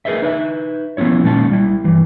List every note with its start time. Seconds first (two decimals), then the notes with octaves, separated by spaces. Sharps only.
0.05 G#4 A#4 B4 D#5 E5
0.22 D#4 B4 D#5 E5
0.97 F3 B3 C#4 E4 C#5
1.24 A#2 D#3 G#3 C#4 A5
1.51 G3 E4
1.84 G2 E3